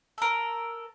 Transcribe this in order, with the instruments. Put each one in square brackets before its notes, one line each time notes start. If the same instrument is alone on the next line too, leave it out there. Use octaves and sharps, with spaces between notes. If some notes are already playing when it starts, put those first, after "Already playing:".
[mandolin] A4 A#4